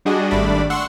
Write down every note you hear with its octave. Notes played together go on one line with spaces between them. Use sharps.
G3 D4 F#4 G#4 D#5
G#1 G3 A3 D4 D5 B5
F#5 C6 C#6 E6